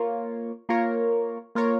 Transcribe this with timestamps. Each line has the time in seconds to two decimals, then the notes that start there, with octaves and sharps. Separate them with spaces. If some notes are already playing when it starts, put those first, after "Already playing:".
Already playing: A#3 F4 A#4 C#5
0.69 A#3 F4 A#4 C#5
1.55 A#3 F4 A#4 C#5